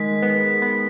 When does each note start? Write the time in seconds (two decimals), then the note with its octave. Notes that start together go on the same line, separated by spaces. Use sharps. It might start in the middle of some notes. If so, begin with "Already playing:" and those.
Already playing: D#3 G#3 B6
0.22 B3
0.62 B3